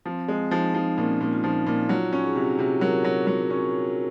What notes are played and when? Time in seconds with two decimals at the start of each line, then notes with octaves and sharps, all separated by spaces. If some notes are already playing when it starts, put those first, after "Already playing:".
0.06 F3 C4
0.28 G#3 C4
0.51 F3 D#4
0.74 F3 D#4
0.98 A#2 C#4
1.21 A#2
1.32 F4
1.43 F3 D#4
1.66 A#2
1.79 D#4
1.89 F#3 F4
2.13 C#4
2.24 G#4
2.35 C3 F#4
2.59 C3
2.81 F#3 A#4
3.04 F#3
3.27 F#3 C#5
3.50 C#4